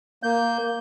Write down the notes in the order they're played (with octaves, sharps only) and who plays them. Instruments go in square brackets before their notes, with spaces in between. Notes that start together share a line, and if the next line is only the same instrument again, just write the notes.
[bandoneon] A#3 G6